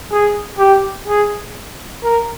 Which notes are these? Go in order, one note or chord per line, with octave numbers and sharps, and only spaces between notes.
G#4
G4
G#4
A#4